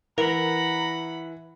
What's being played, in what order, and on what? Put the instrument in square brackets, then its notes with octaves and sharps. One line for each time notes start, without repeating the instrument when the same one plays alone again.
[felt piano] E3 [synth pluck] A#4 [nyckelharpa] F#5 B5 [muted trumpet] A#5